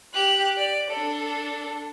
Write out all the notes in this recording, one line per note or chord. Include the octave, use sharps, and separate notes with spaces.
G4 F#6
D5
D4 A4